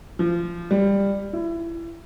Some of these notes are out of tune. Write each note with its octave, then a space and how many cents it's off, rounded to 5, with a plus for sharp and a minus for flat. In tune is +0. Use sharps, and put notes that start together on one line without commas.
F3 -25
G3 +15
E4 +25